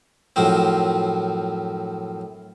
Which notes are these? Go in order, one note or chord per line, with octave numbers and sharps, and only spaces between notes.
F#2 A2 F3 C4